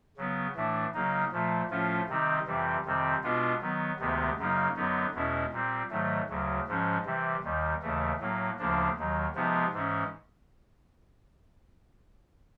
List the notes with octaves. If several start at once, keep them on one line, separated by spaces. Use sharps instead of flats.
C#3 F#3 B3
A2 E3 A3 D4
C#3 F#3 A#3 D#4
A#2 F3 A3
A2 F3 A3 C#4 F4
C3 D#3 G3 C4 D#4
F2 C3 E3 G3
F2 C3 D#3 G3 C4
B2 G#3 B3 D4 F4
D#3 F#3 B3
D2 C3 D#3 G#3 B3
F#2 C#3 F#3 A#3 D#4
F#2 D3 F#3 B3 D#4
E2 B2 G#3 C#4 E4
A#2 G3 C4
G#2 D#3 F#3 A3
D2 C#3 F#3
G#2 F3 G#3 C#4
C3 E3 G3
D#2 D#3 G3
D#2 C#3 E3 A3
A2 F#3 A#3
D2 C#3 F3 A#3 D4
D#2 D#3 F#3
C3 F3 G#3 B3 D#4
G#2 E3 G#3 C#4